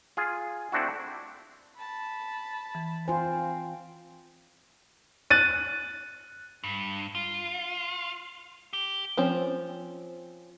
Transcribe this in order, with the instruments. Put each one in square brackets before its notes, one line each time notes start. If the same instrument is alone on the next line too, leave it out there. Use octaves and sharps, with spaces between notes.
[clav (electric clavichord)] F4 G#4
A3 C4 D4 E4 F#4
[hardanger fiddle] A5 B5
[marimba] E3
[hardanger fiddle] C4 [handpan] F4 C5 [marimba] G#5
[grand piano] F#6 A6 D#7
[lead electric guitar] G2
F4
G4
[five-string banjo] F3 C4 C#4